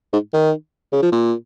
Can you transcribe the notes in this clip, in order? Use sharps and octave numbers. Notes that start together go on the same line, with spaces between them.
G#2
D#3
C#3
F3
A#2